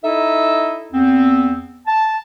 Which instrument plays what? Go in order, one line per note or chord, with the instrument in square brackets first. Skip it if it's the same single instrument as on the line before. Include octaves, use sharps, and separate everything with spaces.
[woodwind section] D#4 E4 A4 D#5 E5
E2 B3 C4
A5